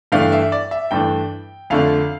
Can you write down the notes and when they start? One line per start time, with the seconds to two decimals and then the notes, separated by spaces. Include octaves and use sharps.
0.12 G2 E3 A3 D4 F5
0.32 E5
0.52 D5
0.71 E5
0.91 G2 E3 A3 D4 G5
1.70 F2 D3 A3 D4 F5